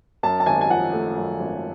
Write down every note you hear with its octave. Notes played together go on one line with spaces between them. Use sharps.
F#2 A5
A5
G#1 G#5
G#5
F3 F#5
A3
F#2
G#1